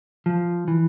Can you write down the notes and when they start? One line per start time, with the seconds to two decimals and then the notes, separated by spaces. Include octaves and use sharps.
0.26 F3
0.68 E3